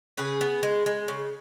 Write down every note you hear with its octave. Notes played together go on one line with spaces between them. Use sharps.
C#3 G#4 B4
B3
G#3
G#3
C#3